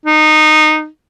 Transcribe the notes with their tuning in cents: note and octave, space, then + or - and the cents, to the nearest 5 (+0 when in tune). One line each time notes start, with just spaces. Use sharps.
D#4 -15